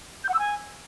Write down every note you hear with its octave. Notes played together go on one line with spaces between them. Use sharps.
G6
F#5
E6
G#5